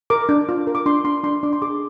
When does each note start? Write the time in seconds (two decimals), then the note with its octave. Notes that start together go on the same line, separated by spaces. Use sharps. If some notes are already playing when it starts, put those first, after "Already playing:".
0.10 A#4 D6
0.29 D4
0.49 F4
0.67 A#4
0.75 D6
0.86 D4 C6
1.05 D4 C6
1.23 D4 C6
1.43 D4 D6
1.53 C6
1.62 G#4 D6